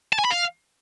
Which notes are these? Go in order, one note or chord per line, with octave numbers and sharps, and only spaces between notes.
A5
G#5
B5
F5